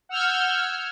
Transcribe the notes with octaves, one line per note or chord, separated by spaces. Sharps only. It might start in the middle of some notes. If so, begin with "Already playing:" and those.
F#5 E6 F6 G6 G#6